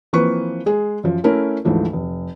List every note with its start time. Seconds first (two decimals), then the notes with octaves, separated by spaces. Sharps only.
0.13 E3 F3 A#3 C4 B4 C#6
0.66 G#3 G#4
1.04 F#2 F3
1.24 A3 C#4 E4 A#4
1.65 D2 G#2 E3 F3 A3
1.93 F1